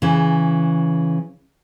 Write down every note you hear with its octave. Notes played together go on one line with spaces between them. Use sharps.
C#3 E3